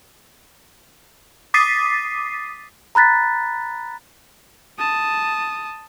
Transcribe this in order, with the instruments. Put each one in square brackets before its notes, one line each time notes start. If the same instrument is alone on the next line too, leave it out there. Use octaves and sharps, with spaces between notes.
[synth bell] D6 D#6 A6 B6 C7 D#7
[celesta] A#5 B5 F#6 A6 B6
[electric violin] A5 D#6